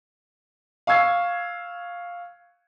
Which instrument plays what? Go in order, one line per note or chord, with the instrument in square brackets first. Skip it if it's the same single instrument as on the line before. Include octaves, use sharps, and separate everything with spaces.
[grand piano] F5 C#6 E6 G#6 C7